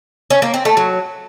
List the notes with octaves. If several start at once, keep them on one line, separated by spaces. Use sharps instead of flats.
C#4
A#3
C4
A3
F#3